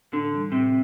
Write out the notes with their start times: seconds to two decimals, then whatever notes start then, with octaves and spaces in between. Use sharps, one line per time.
0.12 A2 D3
0.33 E3 G3
0.52 A2 C3